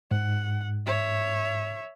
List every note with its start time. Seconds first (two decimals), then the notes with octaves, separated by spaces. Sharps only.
0.11 G#2 F#5
0.86 C#5 E5